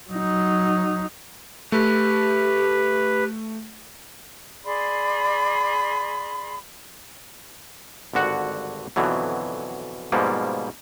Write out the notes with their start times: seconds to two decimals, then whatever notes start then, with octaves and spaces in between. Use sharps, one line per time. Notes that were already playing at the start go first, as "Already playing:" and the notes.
0.10 F#3 D#4
1.72 A3 G4 B4
4.64 G#4 D5 B5 C6
8.14 G#1 G2 D3 F#4 F#5
8.96 F2 B2 D3 E3 F#3
10.12 G#2 B2 F3 G3 A#3